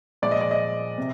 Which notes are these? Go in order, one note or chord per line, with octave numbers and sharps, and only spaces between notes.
A#2 F3 G#3 D5
D#5
D5
D#5
C3